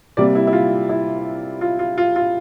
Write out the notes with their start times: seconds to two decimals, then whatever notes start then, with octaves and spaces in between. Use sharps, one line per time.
0.17 C3 G3 A#3 D5
0.35 E4
0.47 E4
0.53 F4
0.89 E4
1.61 F4
1.79 F4
1.98 F4
2.16 F4